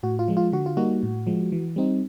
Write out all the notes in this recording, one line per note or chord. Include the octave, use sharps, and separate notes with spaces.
A2 F#4
F4
F3 G#3
F4
D3 F#4
F4
G3 A#3 D#4 F#4
A2
F3 G#3
E3
G3 C4 D#4